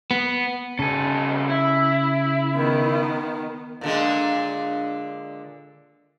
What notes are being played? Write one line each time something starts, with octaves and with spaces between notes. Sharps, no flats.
B3
C2 C#3 A4 G#5
E4
D#3 B3
A#2 D3 G#3